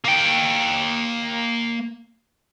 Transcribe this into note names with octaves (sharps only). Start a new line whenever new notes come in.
A#3 G5